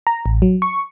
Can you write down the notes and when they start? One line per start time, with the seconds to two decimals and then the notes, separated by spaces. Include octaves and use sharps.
0.07 A#5
0.26 A1
0.42 F#3
0.62 C#6